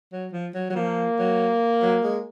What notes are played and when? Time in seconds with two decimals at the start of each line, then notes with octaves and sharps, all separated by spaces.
0.12 F#3
0.33 F3
0.54 F#3
0.70 F#3
0.75 F3 A#3
1.19 F#3
1.82 F#3
2.03 G#3